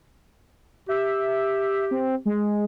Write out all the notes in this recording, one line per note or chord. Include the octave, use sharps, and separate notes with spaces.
G4 E5
C4
G#3